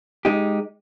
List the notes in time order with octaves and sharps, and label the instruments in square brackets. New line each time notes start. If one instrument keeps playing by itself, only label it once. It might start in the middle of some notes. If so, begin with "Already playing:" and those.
[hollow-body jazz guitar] G#3 D#4 G4